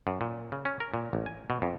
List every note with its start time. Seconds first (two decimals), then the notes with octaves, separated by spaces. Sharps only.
0.07 F#2
0.21 A#2
0.52 C#3
0.65 C#4
0.80 A#4
0.94 A#2
1.13 A1
1.26 G#5
1.50 B2
1.62 F2